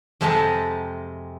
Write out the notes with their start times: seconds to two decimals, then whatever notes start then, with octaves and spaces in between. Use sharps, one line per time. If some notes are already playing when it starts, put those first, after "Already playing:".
0.21 F2 C3 G#3 E5 A5 A#5